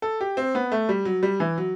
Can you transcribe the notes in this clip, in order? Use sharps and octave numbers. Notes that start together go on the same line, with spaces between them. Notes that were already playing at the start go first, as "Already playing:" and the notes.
A4
G4
C4
B3
A3
G3
F#3
G3
E3
F#3